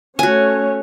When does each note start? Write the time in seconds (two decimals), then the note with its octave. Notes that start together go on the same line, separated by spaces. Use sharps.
0.19 A3 C#4 F#4 C#5 G#5